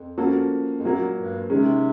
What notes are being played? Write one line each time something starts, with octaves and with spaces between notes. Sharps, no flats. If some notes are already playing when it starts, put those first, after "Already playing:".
Already playing: F2
F3 A#3 C#4 F#4 A4
F2
F#2 A#2 F#3 A#3
G2
C3 D#3 G#3 C#4